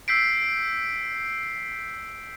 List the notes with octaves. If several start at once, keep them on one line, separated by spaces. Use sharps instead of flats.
E6 G6 B6 C7 D7